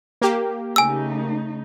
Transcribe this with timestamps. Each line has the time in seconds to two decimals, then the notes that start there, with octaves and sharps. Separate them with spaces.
0.22 A#3 G4
0.76 C#3 A3 D#4 G#5 E6